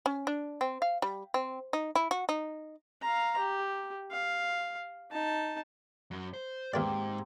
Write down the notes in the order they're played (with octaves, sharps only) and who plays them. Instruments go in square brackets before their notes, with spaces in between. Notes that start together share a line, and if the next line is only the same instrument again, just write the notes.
[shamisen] C#4
D4
C4
F5
G3
C4
D#4
E4
F#4
D#4
[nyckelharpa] F5 A#5
G4
F5
D#4 A5
[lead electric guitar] F#2 C#4
C5
[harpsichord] D#2 B4 D5 [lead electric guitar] G#2 [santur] A#3 C4 G4